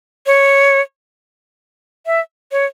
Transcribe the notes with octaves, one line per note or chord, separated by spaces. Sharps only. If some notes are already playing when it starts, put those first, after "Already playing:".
C#5
E5
C#5